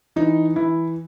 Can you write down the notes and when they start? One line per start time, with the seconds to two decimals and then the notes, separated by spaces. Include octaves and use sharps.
0.16 E3 D#4
0.56 E3 E4